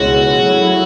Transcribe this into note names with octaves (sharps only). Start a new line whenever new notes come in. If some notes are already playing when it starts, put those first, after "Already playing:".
Already playing: C#2 B2 G#3 C#4 E4 F#4
F#3 A3 E4 G#4 C#5